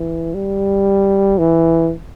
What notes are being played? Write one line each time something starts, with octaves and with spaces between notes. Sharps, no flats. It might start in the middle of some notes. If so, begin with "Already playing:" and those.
Already playing: E3
G3
E3